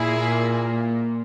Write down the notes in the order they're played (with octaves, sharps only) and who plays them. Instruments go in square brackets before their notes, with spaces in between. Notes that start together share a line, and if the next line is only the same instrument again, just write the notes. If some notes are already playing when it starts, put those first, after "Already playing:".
Already playing: [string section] A#2 A#3 E4 G#4